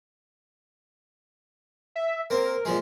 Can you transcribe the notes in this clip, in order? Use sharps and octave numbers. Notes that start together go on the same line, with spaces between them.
E5
A#3 C4 A#4
A#2 F3 G#3